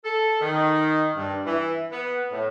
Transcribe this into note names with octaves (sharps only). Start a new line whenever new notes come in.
A4
D#3
G2
E3
B3
A2